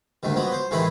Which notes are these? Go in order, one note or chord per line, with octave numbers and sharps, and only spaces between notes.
D2 G#2 D#3
F3 F#3 B3
C5
A2 D#3 E3 G#3 E4 B5